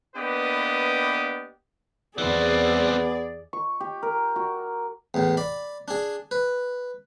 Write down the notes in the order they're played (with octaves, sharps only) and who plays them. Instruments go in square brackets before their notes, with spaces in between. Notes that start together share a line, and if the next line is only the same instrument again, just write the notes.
[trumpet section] A#3 B3 D4 G4 B4 D#5
[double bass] E2 [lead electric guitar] E3 C4 [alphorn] B3 [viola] G#4 D5
[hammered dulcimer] C#6
G4
A#4
F#4
[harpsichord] E2 A2
D5 B5
D4 G#4
B4